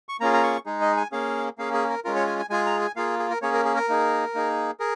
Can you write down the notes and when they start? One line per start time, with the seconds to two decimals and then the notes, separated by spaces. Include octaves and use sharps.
0.09 C#6
0.21 A#3 C#4 F4 G#4 A#5
0.33 A#5
0.43 C#6
0.66 G#3 D#4 G#4
0.81 D#5
0.97 G#5
1.12 A#3 C#4 G#4 F5
1.58 A#3 C#4 G#4 F5
1.73 G#4
1.89 A#4
2.05 G#3 C#4 F4 A#4
2.16 C#5
2.27 G#5
2.39 G#5
2.50 G#3 F4 G#4 G#5
2.66 A#5
2.81 G#5
2.96 A#3 F4 G#4 F5
3.19 G#4
3.30 A#4
3.42 A#3 C#4 G#4 C#5
3.54 A#4
3.65 G#4
3.76 A#4
3.89 A#3 D#4 G#4
4.34 A#3 D#4 G#4
4.80 G#4 A#4